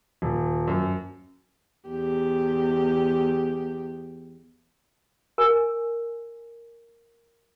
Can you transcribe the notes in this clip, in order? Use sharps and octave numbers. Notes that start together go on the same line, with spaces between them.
D#1
F#2
E2 G4
A#4 G#5